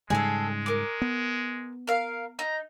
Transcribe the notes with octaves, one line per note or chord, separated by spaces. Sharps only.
G#2 C#3 G3 G#3 G#4 A4
A#4 D6
B3
A#4 F5
D#4 A#5